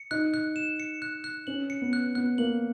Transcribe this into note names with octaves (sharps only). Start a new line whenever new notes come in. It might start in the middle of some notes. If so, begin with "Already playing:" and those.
Already playing: C#7
D#4 F#6
F#6
E7
C#7
F#6
F#6
C#4 F#7
C#7
B3
F#6
B3 F#6
A#3 F#7